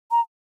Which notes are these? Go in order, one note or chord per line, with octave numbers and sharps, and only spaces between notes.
A#5